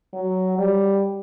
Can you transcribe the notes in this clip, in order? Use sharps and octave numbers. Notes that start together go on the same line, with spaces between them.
F#3
G3